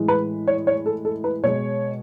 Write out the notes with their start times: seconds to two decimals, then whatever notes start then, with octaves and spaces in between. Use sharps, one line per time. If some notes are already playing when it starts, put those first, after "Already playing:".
Already playing: A2 E3 G#3
0.08 B4
0.47 C#5
0.67 C#5
0.86 A4
1.05 A4
1.24 B4
1.43 B2 G#3 C#5